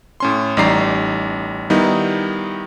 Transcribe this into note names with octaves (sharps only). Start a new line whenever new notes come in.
A2 C#4 C6
A1 G3 D#4 D5 A#5 C7
D#3 G3 B3 D#4 E4